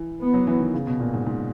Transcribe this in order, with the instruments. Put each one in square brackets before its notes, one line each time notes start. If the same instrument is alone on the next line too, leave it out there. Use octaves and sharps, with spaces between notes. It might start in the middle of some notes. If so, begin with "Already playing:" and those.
Already playing: [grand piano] E3
[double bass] B3
[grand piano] F#3
E3
D#3
C#3
B2
A#2
G#2
G#2